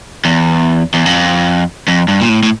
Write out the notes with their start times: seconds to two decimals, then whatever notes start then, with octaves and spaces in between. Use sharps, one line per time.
0.25 E2
0.94 E2
1.06 F2
1.88 F2
2.08 G2
2.21 A#2
2.29 A2
2.43 A2